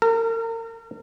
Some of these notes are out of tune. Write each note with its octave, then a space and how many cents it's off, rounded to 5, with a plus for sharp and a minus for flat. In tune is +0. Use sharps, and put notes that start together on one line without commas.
A#4 -35